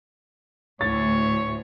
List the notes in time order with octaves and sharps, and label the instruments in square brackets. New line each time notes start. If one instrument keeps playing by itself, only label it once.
[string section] D2 A2 [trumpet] C#5 [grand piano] A6